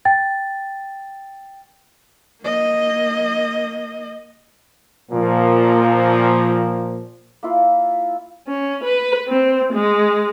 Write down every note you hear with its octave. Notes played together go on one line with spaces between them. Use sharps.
G5 A6
A#3 D#5
A#2 F3
A#3 E4 F4
C#4
B4
C4
G#3